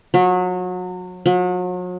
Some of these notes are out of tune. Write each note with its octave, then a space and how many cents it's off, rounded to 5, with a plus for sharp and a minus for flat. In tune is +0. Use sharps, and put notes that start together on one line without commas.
F#3 -30
F#3 -40